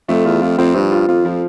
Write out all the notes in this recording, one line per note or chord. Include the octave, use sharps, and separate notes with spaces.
F2 A3
E2 F4
F2 F4
F2 C4
G2 F3
F4
F2 F4
F3